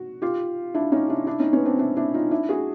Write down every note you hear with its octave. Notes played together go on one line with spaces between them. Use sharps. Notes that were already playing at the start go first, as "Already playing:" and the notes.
Already playing: F#4
F4 G4
D4 E4
C#4 D#4
D4 E4
D4 E4
C#4 D#4
B3 C#4
C4 D4
D4 E4
D4 E4
D#4 F4
D4 E4
F#4 G#4